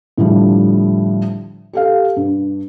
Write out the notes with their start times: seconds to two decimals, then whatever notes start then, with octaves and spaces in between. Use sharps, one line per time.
0.18 A2 D3 F3 G3
1.73 G4 A4 F5
2.17 G2